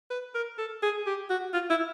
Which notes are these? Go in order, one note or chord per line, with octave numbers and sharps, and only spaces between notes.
B4
A#4
A4
G#4
G4
F#4
F4
E4